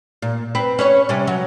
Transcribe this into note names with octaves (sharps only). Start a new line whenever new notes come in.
A#2
C4 B4
C#4 B4 C#5
C3 G3 C#4
F#3